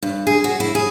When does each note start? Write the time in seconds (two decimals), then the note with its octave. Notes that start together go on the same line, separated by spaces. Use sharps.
0.03 G2
0.27 G#4
0.44 F#4
0.60 E4
0.75 G#4